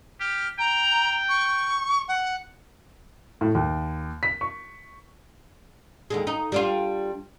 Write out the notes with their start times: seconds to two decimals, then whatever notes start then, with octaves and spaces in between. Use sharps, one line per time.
0.20 G4 F6
0.59 G5 A#5
1.29 C#6
2.08 F#5
3.41 A2
3.55 D#2
4.23 B6
4.41 C#6
6.10 D#2 D3 G#3
6.27 D#4
6.52 G3 D4 F4